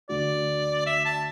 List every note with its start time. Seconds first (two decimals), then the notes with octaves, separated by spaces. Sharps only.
0.09 D2 D3 A3 D4 F#4 D5
0.86 E5
1.05 A5